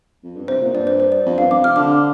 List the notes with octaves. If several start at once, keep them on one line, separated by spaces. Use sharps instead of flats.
F2
G2
C3 C5
A#2
G2 D5
C5
C5
D5
F2
G2 F5
F2 D6
C3 F6
D3 D6